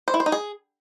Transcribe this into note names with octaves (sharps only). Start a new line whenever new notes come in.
C5
E4
C5
D#4
G#4